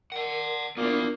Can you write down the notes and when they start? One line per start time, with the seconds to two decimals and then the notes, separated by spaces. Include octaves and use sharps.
0.12 A#4 D5 F#5
0.77 A#2 A#3 B3 D4 E4 A#4